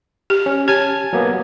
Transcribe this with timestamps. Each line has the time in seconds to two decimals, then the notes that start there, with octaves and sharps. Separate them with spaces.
0.30 G4
0.46 C#4
0.68 G4 G#5 A5 G#6
1.13 F#3 A#3 B3